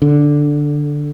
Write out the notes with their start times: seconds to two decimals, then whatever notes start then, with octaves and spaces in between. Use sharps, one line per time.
0.02 D3